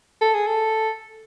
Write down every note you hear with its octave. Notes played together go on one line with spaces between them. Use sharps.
A4
G#4
A4